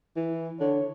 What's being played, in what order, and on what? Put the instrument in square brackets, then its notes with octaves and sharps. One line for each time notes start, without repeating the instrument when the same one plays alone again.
[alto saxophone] E3
[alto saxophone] D3 [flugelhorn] C#5